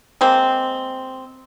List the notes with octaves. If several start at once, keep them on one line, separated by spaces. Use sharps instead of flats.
G#3 A#3 C4